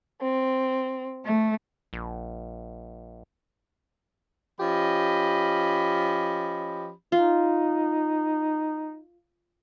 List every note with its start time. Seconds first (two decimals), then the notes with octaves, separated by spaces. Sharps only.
0.20 C4
1.24 A3
1.93 A#1
4.60 F3 C#4 G4 D#5 B5
7.12 D#4 F4